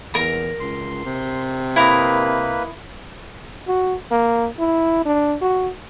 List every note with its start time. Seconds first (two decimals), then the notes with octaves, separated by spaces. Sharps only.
0.14 E2 A#4 A#5
0.60 C#2 C6
1.05 C3
1.76 A#3 E4 A#4 B4 D#5
3.67 F#4
4.11 A#3
4.59 E4
5.05 D4
5.41 F#4